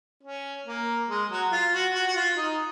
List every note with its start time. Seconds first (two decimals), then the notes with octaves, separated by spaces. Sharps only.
0.23 C#4
0.66 A#3
1.09 G#3
1.30 F#3
1.51 F4
1.73 F#4
1.95 F#4
2.07 F#4
2.16 F4
2.37 D#4